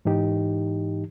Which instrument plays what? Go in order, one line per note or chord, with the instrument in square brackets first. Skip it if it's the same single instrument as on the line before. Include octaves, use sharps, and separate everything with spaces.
[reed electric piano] G#2 E3 D#4 G4